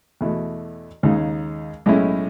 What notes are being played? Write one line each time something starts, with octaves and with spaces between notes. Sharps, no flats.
E2 B2 A3 E4
D#2 C#3 G#3 D#4
B1 A2 G#3 C#4 E4